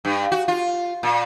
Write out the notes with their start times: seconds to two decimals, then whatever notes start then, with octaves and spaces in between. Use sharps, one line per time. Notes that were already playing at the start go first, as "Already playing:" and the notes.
0.05 G2
0.32 F#4
0.48 F4
1.03 A#2